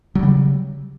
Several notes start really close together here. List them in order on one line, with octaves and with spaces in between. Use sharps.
F#3 G3 C#3